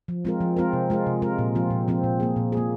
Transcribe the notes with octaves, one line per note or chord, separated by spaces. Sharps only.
F3
G#3 C4 F4 A#4
F3
G#3 C4 F4 A#4
C3
G#3 F4 A#4
C3
G#3 F4 A#4
A#2
F3 C4 F4
A#2
F3 C4 F4
A#2
A#3 G#4
A#2
A#3 G#4